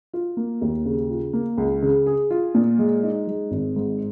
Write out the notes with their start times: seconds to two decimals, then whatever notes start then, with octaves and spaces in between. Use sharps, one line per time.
0.13 F4
0.37 A#3
0.62 D#2
0.85 C#3
1.10 F4
1.33 A#3
1.58 C#2
1.83 C#3
2.06 G#4
2.30 F4
2.55 A#2
2.78 G#3
3.03 D#4
3.27 G#3
3.51 G#1
3.76 G#2